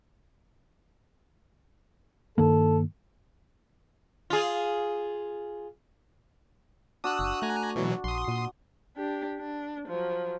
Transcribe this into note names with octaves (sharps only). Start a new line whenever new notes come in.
G2 D#3 A#3 A4
F4 G#4
D4 F#4 D#6 E6 F#6
F#1
A3 G#5 A#5 F#6
B2 E3 F#3
A#1 C6 D#6
A#2
D4 G4
D4
F3 F#3